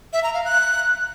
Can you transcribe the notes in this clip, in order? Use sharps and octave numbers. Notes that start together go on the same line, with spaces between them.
E5
A#5
F5
F#6